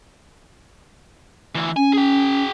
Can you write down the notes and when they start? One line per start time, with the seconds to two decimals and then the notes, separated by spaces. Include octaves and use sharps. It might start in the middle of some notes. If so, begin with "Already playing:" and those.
1.55 D2 E3
1.77 C#4 G#5
1.93 G#4 G5